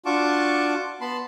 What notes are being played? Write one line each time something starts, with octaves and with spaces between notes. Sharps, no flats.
D4 F4 F#4 A5 C#6 D6
B3 A5 B5 C6